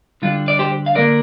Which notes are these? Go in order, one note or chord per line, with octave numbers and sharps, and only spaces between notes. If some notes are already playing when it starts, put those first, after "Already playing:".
D3 G3 D4 F4
D5
G4 C5
F5
D3 A#3 D4 A#4 D5